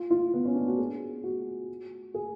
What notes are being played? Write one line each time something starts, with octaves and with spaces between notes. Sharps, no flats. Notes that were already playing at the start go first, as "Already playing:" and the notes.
Already playing: F4
F4
B3
C#4
D4
F#4
G#4
F#4
G#4